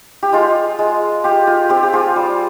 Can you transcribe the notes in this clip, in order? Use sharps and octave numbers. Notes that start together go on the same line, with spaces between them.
G4
G#3 F4
G#3
F4 G4
F4
C4 G4
G4
F4 G#4
G3